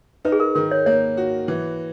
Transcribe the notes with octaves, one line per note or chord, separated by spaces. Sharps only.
D#4 B4
G#4
A#4
D#3 A#4
C#5
A#3 C#5
F#4
E3